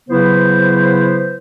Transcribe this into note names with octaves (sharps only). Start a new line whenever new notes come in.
C#3 F#3 B3 E4 B4 C5